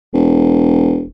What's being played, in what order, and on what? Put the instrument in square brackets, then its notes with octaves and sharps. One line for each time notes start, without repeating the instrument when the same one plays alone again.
[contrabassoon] E1